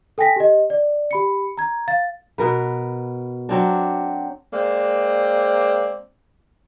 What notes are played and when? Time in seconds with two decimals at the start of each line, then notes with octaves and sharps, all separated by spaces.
0.18 A4 G5 G#5 A#6 B6
0.36 G4 D#5
0.70 D5
1.11 G4 B5 C#7
1.58 A#5 G#6
1.88 F5 A6
2.38 B2 A#4 B4
3.49 F#3 C4 D4
4.53 G#3 A#3 C4 D5